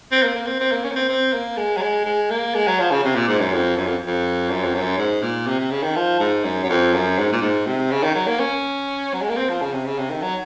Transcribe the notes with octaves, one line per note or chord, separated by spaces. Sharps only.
C4
A#3
A#3
C4
C4
A#3
C#4
A#3
C4
C4
A#3
G#3
F#3
G#3
G#3
A#3
G#3
F#3
F3
C#3
C3
A#2
G#2
F#2
F2
F#2
F2
F2
F#2
F2
F#2
G#2
A#2
C3
C3
C#3
D#3
F3
G#2
F#2
F#2
F2
F#2
G#2
A#2
G#2
C3
C#3
D#3
F#3
A#3
C#4
F#3
G#3
A#3
C4
F3
C#3
C3
C#3
C3
D#3
F#3